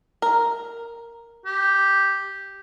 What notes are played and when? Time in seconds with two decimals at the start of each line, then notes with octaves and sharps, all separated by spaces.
0.22 A#4
1.46 G4